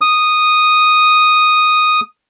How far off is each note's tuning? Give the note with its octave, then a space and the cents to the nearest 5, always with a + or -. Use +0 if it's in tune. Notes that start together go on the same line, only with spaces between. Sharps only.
D#6 -5